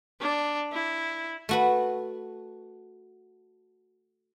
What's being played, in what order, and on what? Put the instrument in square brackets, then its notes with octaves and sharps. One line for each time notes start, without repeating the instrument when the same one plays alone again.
[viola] D4
E4
[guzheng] A3 F#4 B4